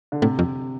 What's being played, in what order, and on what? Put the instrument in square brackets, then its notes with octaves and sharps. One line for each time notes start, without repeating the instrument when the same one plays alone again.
[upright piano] D3
[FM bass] A2 [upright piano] C3
[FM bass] F2